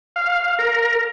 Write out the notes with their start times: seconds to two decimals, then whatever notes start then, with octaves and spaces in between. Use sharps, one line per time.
0.16 F5
0.59 A#4